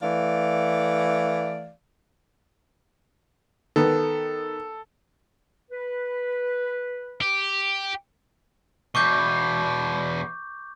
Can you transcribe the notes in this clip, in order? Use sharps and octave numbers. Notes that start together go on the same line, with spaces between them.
E3 A3 D5 F5
D#3 B3 A4
B4
G4
E2 B2 C#6 D6 G6